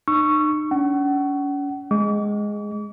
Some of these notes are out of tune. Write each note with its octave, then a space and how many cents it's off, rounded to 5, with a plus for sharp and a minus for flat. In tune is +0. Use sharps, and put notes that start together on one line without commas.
D#4 -40 C#6 +0 E6 +35
C#4 +40 F#5 +35
G#3 +0 D6 -45